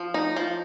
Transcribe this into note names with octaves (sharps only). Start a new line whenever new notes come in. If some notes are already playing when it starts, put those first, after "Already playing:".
Already playing: F3
D#4
F3